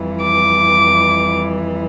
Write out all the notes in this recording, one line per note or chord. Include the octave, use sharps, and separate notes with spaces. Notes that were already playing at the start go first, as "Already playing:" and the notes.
Already playing: F2 E3 G3
D6